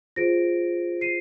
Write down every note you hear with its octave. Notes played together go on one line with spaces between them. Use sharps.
F4 G#4 C5 A#6 D7
C7 D#7